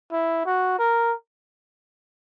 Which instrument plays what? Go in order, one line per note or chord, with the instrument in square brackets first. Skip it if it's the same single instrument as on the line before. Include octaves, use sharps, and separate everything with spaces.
[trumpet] E4
F#4
A#4